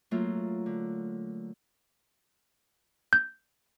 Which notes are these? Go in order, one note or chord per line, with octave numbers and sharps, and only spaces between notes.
F#3 A3 A#3 F4
D3
G6